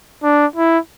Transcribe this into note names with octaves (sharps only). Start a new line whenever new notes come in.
D4
E4